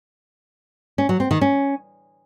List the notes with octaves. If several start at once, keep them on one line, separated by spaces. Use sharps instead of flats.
C#4
F#3
C4
D#3
C#4